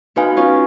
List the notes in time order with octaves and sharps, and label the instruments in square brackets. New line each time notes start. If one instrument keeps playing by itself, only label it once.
[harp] B3 D#4 [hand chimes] F#4 B4 F5 G#5
[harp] C#4 F4